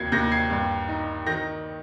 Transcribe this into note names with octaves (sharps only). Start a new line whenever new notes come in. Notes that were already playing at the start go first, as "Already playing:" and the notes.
Already playing: D#2 G#6 C7
D#2 G6 A#6
G#6 C7
G2
D#4
D#3 G6 A#6